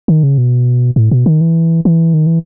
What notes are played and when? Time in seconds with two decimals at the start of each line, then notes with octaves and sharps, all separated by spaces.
0.08 D#3
0.23 C#3
0.38 B2
0.96 A2
1.11 B2
1.26 D#3
1.41 E3
1.85 E3
2.14 D#3
2.26 E3